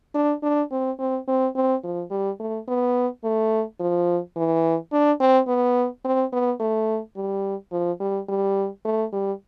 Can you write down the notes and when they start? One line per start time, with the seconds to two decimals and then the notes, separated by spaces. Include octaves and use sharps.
0.15 D4
0.43 D4
0.72 C4
0.99 C4
1.28 C4
1.56 C4
1.84 F3
2.11 G3
2.40 A3
2.68 B3
3.24 A3
3.80 F3
4.37 E3
4.92 D4
5.20 C4
5.48 B3
6.05 C4
6.33 B3
6.60 A3
7.16 G3
7.72 F3
8.00 G3
8.29 G3
8.85 A3
9.13 G3